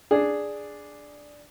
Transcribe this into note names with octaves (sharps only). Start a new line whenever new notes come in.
D4 G#4